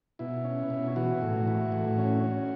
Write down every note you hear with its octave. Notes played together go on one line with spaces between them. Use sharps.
B2 E4
C#4
B2
E3 F#4
A2
E3
A2
C#4
C#4